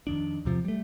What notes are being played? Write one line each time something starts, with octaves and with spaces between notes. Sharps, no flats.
F2 D#3 D4
E2 C3 F3
G3 A3